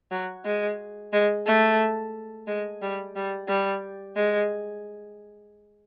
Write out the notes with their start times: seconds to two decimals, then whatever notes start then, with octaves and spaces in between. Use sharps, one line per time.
0.11 F#3
0.45 G#3
1.13 G#3
1.46 A3
2.47 G#3
2.82 G3
3.16 G3
3.48 G3
4.16 G#3